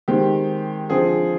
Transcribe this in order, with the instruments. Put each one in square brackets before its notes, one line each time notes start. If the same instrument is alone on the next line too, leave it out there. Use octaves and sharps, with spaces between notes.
[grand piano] D#3 G#3 C4 G4
D3 F3 C4 G#4